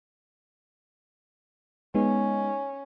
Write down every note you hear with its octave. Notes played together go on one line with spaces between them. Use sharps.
G#3 B3 C#4 D#4